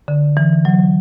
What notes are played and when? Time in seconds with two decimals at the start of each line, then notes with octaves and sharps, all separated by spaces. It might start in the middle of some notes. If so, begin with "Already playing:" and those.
0.08 D3
0.37 E3
0.65 F#3